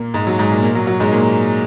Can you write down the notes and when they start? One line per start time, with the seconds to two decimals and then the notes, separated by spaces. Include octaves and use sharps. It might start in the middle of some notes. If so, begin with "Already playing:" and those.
Already playing: A#2 A#3
0.14 G#2 G#3
0.27 F#3
0.39 G#2 G#3
0.51 A#2 A#3
0.63 A#2 A#3
0.75 F#3
0.87 F#3
1.00 G#2 G#3
1.12 A#2 A#3